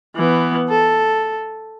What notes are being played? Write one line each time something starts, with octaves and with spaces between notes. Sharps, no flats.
E3 B3
A4